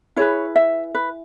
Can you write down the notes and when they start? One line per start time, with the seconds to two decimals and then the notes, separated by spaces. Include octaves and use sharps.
0.16 E4 G#4 B4 C#5
0.56 E5
0.95 B4